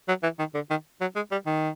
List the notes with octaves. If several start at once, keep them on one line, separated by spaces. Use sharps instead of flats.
F#3
E3
D#3
D3
D#3
F#3
G#3
G3
D#3